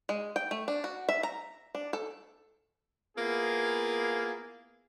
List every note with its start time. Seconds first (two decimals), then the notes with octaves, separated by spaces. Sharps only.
0.09 G#3
0.36 G5
0.51 A3
0.68 D4
0.84 F#4
1.09 E5
1.23 A#5
1.75 D4
1.93 A4
3.18 A#3 B3 E4 F4 G#4